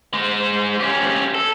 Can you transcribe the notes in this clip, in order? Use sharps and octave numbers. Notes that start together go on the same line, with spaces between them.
G#3 C5
C#4 G4
A4